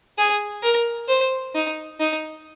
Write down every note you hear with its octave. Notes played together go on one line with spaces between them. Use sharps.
G#4
A#4
C5
D#4
D#4